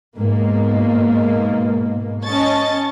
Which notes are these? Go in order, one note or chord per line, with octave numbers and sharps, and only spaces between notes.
G#2 B2 A#3
C#4 D#5 A5 C#6 A6